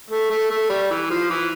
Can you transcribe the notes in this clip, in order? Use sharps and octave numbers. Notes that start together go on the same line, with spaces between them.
A3
A3
A3
G3
E3
F3
E3